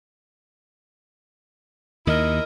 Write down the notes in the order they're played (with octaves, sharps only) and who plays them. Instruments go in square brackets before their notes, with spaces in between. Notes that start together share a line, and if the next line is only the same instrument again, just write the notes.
[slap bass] D#2 D#3 [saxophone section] E4 A#4 D#5